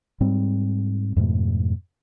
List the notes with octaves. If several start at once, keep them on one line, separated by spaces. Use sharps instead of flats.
G#2 G3 C4
F2 G#2 B2 A3